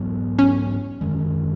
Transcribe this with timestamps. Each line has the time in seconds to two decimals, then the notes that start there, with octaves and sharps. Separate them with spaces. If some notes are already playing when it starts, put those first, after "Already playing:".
Already playing: G#2 F#3 B3
0.39 C#4
1.01 F#2 D#3 G#3